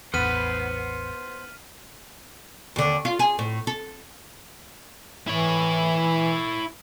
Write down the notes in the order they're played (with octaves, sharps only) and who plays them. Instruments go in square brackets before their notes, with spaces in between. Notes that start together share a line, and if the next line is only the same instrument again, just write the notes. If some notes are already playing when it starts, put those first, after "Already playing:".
[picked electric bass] A1 E2 [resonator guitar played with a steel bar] B3 [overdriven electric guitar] C5 F#5 [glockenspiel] F6 B6 D#7
[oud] D#2 D3
F4
G#4
A2
A4
[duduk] E3 [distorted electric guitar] E4 C#5